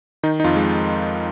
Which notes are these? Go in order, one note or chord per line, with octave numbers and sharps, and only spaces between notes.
D#3 D#4
D#4
F2 F4
G#3